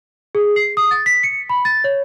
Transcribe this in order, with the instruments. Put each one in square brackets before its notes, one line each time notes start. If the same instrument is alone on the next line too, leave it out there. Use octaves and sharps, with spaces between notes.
[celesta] G#4
C7
D#6
A6
B6
C#7
B5
A6
C#5